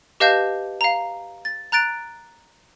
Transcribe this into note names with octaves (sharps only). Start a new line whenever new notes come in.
G4 B4 D#5 F5 A5 G6
F5 A#5
A6
A#5 F#6 A6 D7